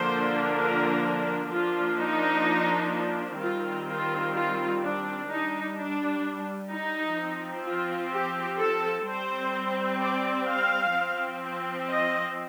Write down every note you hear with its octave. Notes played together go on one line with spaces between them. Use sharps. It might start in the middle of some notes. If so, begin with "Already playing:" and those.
Already playing: D3 F3 A#3 D4 C5
A#4
F3 A#3 D4 F4
D#4
D#3 G3 C4 F4
F4
F4
D4
G3 D4 D#4
D4
D#4
F3 C4
F4
G4
A4
G3 C4 C5
D5
F5
F3 C4
D#5